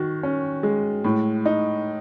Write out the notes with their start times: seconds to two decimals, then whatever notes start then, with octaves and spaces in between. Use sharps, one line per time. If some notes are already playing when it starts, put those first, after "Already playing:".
Already playing: D#3 F#4
0.23 C#4
0.63 G#3
1.04 A2
1.45 D#4